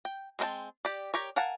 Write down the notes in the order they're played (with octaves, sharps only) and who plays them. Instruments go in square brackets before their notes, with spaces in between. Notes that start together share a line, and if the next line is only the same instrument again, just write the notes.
[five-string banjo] G5
G#3 C4 A#4 G5 A5
G4 D5
G4 A#4 C#5
A#4 F5 F#5 G#5 A5